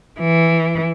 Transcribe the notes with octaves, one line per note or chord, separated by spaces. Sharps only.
E3